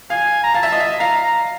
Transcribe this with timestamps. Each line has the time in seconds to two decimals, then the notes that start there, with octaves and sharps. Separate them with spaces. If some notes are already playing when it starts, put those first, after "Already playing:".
0.10 F5 G#5
0.43 A#5
0.54 F5 A5
0.63 E5
0.72 D#5
0.80 E5
0.99 F5 A#5
1.22 A#5